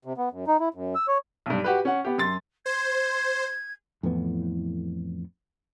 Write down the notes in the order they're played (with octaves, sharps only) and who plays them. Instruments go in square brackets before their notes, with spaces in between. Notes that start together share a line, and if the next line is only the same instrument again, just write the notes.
[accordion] C3
B3
F#2
D#4
E4
F#2
E6
C#5
[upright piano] B1 G2
F#4 G4 B4
C#4 F#5
B3 G4
F#2 C6 A6
[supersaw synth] C5 [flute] G#6
[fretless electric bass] F2 A2 E3 B3